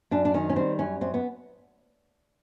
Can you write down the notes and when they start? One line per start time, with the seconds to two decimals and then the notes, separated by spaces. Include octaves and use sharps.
0.11 F#2 D4
0.25 D4
0.34 D#3 C#4
0.49 C#4
0.56 G3 C4
0.79 F#2 C#4
1.01 F#2 C4
1.14 B3